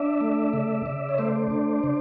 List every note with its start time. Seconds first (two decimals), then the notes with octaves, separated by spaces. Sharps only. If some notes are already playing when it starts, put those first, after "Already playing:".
Already playing: D4 D5 E5
0.21 A3
0.53 C#3
0.86 C#3
1.09 C#5
1.18 A3 C5 D5
1.51 D4
1.84 C#3